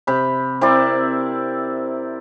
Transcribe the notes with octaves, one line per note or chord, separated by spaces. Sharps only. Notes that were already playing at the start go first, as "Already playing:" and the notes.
C3 B5
C4 E4 A#4 D5